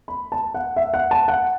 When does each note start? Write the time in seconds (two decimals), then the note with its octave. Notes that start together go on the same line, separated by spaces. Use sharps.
0.08 B5
0.32 A5
0.54 F#5
0.76 E5
0.94 F#5
1.11 A5
1.28 F#5